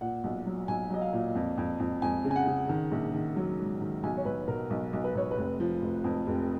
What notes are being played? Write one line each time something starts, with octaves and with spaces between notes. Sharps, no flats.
A#2 F#5
B1
F#3
B1 G#5
F#3 D#5
F5
A#2
F2
F2
F2
F2 G#5
C#3
G#5
F#5
C#3
D#3
A#1
D#3
F#3
G#2
D#3
B1 G#5
C#5
B1 B4
B2 A#4
B1
B1
B4
B1 C#5
B4
F1
F3
F1
F2
F1